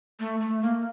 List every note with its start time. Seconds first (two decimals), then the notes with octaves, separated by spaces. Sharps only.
0.20 A3
0.40 A3
0.62 A#3